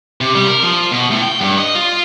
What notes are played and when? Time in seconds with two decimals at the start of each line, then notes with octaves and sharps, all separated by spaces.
0.21 C3
0.35 G3
0.48 A#4
0.63 F3
0.91 B2
1.11 A2
1.22 G5
1.41 G2
1.58 D#5
1.75 F4